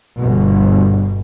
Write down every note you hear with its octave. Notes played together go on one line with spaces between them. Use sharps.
G1 B2